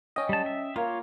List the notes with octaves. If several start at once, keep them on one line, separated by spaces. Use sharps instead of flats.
C#4 D#5 G5
G3 A5
E5
A#3 F4 C#5